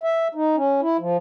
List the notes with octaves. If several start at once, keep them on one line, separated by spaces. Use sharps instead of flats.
E5
D#4
C#4
E4
F3